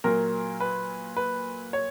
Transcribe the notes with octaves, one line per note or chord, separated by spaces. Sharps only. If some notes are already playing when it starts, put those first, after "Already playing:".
A#2 F#3 A#3 A#4
B4
B4
C#5